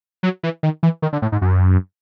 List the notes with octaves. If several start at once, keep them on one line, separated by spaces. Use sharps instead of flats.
F#3
E3
D#3
E3
D#3
D3
A2
G#2
F#2